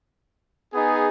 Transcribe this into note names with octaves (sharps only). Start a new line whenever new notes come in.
B3 D#4 G#4